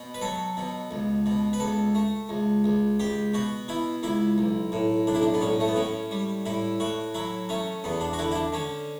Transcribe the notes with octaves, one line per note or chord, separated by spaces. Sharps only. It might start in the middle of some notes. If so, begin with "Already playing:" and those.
Already playing: B2
B4
F#3 A4
B2
C#2
B2
B4
C#2 A4
A3
C#2
C#2
C#2 G4
B2 F#4
B2 E4
C#2 E4
B1
A2
B1 D4
E4
D4
B3
A2 C#4
A3
B3
A2 C#4
G3
A2 E4
A2 F#4
F#3 E4
A3 C#4
E2 B3
D4
F#4
D3 E4
E4
D4
D3 C#4